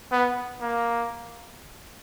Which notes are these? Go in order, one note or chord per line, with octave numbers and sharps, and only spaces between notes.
B3
A#3